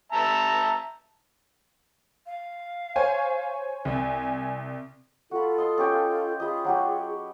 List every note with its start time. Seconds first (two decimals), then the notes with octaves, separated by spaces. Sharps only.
0.12 E5 A5 A#5
2.26 F5
2.96 C5 C#5 G#5
3.85 C2 G#5
5.31 F4 F#4 A4 B5
5.58 D#5 C6
5.78 C#4 G4 G5
6.40 F4 G#4 D#5 B5
6.65 F#3 F#4 G4